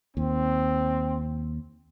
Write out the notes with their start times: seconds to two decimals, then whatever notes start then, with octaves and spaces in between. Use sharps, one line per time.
0.17 D#2 C4